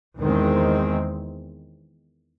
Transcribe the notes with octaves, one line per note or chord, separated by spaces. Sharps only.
E2 D#3 G#3 C4